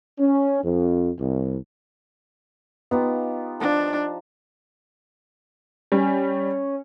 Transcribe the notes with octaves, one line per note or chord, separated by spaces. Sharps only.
C#4
F2
C2
B3 D#4 F4 G4
F3 D4 A5
G3 C#4